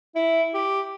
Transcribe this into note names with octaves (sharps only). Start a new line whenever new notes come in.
E4
G4